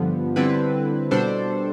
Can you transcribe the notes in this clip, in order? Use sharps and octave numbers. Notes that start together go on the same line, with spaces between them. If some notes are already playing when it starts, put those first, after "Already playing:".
Already playing: G2 D3 F3 B3
D3 G3 C4 E4 B4
B2 G3 D4 A4 C5